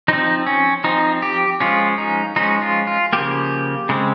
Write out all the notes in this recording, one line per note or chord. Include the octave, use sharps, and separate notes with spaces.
F3 C4 D#4
C#4
F3 C4 D#4
G4
F3 G#3 C#4 F4
D#4
F3 G#3 C#4 D#4
F4
F4
C#3 F3 A#3 G4
C#3 G#3 C4